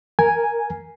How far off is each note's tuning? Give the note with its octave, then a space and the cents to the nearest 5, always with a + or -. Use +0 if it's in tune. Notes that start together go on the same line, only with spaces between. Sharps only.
A#4 +0 G#5 +0